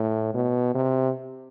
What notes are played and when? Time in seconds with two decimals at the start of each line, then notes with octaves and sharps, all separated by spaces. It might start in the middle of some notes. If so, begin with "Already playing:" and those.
Already playing: A2
0.34 B2
0.74 C3